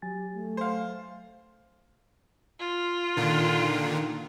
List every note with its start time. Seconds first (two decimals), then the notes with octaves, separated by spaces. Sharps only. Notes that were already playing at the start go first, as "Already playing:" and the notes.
0.02 F#3 G4 G#5 A6
0.34 A3
0.57 C5 F5
2.59 F4
3.17 A#2 D3 D#3